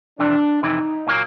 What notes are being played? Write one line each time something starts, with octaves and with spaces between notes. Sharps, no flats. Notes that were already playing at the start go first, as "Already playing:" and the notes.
F2 C3 E3 D4
F2 C3 E3 D#4
A#2 F#3 A#3